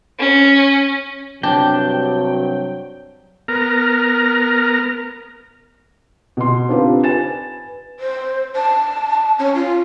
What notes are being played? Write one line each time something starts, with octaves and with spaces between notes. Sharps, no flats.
C#4
G2 C3 F#3 D4 G5
B3 A#4 A#5 F6
B2 C6
C4 D4 D#4 F4 G4 B4
B4 G#5 A6 E7
C5
A5
C#4
F4